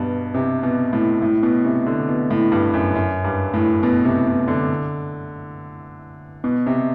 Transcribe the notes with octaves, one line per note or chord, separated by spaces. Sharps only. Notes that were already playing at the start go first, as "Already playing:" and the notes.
Already playing: G2 B2
C3
B2
A2
A2
B2
C3
D3
B2
A2
G2
F#2
F#2
G2
A2
B2
C3
B2
D3
B2
C3